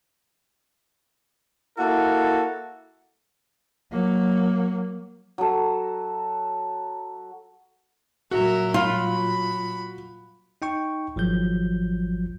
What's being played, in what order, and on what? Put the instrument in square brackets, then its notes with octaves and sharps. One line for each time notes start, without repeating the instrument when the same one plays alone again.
[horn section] A#3 E4 F#4 A4
[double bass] F#3 A#3
[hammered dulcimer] F#3 A4
[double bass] A#2 F#3 [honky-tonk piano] F#4 [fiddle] A#4 E5
[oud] F4 [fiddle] B5
[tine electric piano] D#4 G5 C#6
G#1 F3 F#3 G6